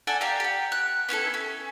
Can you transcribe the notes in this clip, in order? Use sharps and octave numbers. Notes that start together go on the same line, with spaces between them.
A4 D5 F#5 G#5
G4 F5 G5 A#5
G4 F#5
F#6
B3 C#4 E4 A4
C#4